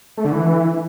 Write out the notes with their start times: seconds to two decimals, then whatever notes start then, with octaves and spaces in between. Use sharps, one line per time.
0.17 A3
0.25 D3
0.32 E3